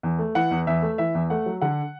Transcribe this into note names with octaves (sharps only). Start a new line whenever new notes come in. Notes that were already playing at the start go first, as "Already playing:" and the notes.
E2
A3
E3 F#5
E2
E2 E5
A3
E3 E5
E2
A3 F#5
F#3
D3 F#5